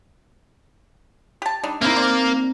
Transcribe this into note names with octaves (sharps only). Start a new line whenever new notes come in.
G4 A5
G3 D4 D#4
A#3 C4 D#4 E4 E5
C5 D5